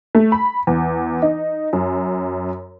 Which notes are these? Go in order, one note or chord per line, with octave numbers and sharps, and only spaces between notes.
A3
B5
E2
D#4
F#2